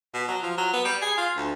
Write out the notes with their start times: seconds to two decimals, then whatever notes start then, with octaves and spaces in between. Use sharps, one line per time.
0.14 B2
0.28 F#3
0.43 F3
0.58 F#3
0.73 B3
0.85 G3
1.02 G#4
1.17 F4
1.36 D2